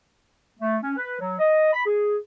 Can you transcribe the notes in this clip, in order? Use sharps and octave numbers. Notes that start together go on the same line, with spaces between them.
A3
C#4
B4
F#3
D#5
B5
G#4